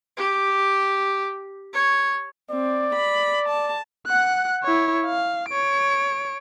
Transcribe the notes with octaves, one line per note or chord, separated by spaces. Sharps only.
G4
C#5
C4 D5
B5
A5
F#5 F#6
E4 C#5
F5
C#5 D7